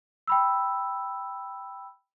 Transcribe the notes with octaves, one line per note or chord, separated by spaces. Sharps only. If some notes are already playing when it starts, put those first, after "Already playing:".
G5 B5 E6